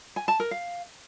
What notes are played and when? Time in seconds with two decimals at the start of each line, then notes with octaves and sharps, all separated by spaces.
0.16 G#5
0.28 A5
0.40 A#4
0.51 F5